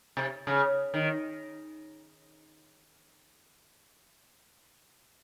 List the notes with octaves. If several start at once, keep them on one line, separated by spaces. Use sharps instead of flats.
C3
C#3
D#3